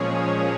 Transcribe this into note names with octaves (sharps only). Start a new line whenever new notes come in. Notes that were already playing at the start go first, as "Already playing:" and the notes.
Already playing: A#2 F3 G#3 C#4 G#4 C#5